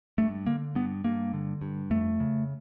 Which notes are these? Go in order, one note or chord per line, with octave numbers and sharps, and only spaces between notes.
G2 A3
D3 A#3
G2 B3
G2 A#3
D3
G2
F2 A3
C#3